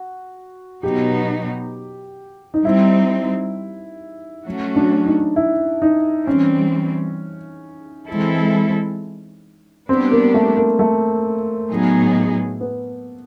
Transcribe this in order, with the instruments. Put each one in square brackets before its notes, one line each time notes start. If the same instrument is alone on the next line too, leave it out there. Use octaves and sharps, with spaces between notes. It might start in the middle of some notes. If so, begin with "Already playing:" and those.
Already playing: [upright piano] F#4
[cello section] B2 F#3 B3 D#4 [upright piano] G4
[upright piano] D#4
[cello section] G3 C4 D#4 [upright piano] E4
[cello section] F#3 A3 C#4 F#4
[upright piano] D4
D#4
E4
D#4
[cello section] E3 G3 C4 [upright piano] C#4
[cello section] E3 G#3 C4 E4 A4
[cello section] G3 B3 D4 G4 [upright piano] C4
[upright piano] A#3
A3
A#3
A3
[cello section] A2 F#3 B3 D#4 G#4
[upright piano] B3